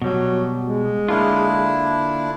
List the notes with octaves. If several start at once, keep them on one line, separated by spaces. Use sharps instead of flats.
B2 F#3 G3
G#3
D3 A#3 D4 E4 F4